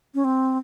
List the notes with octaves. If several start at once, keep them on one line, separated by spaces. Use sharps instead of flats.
C#4
C4